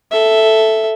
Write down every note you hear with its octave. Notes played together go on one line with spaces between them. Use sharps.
A4 E5